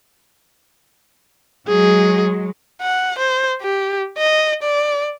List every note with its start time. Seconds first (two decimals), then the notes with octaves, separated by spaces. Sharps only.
1.68 F#3 G#3 G#4
2.82 F#5
3.19 C5
3.62 G4
4.18 D#5
4.63 D5